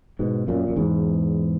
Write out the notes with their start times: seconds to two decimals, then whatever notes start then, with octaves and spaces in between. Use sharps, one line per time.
0.19 G#2 B2
0.48 F#2 A#2
0.68 F#2
0.76 E2 G#2